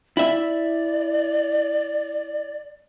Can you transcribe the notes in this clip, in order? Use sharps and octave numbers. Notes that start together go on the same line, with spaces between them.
E4 D5 E5